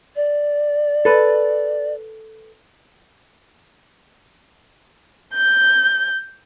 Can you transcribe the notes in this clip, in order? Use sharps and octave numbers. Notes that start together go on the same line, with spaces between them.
D5
A4 B4
G6